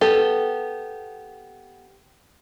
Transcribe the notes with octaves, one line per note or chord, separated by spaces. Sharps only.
B3 G4 A4